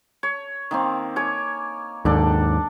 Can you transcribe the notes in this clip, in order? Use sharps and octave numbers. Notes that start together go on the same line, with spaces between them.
C#5
D#3 A#3 C4
C#5 G#5 D6
D#2 G#2 D4 A4 D5